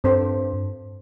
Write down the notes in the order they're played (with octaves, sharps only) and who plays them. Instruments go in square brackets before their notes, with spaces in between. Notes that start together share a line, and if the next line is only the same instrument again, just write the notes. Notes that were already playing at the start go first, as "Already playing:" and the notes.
[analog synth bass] G2 [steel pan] C4 A4 C5